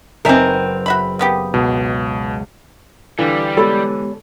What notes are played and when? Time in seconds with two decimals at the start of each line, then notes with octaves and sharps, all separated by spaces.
0.25 F#1 C4 D#4 A#4 B4 E5 G#5 C#6
0.86 F#4 E5 B5
1.19 A#3 B3 G4 D#6
1.54 C#2 B2
3.19 D3 E3 G3 F5
3.57 G#3 B3 G4 A4 C#5 B5